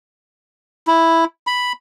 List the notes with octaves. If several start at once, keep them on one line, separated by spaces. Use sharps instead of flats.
E4
B5